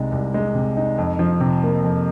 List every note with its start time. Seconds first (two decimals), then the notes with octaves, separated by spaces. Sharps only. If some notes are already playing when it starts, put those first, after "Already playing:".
Already playing: C2 C3 G#3 D#4
0.12 C2
0.34 G#3
0.55 C3
0.77 D#4
0.98 F2
1.19 F3
1.40 C3
1.63 A#3
1.84 F2